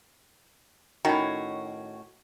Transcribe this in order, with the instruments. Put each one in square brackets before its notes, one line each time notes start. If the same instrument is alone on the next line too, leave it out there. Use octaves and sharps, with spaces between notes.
[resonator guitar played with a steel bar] A2 C#4 F#4 [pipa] D#3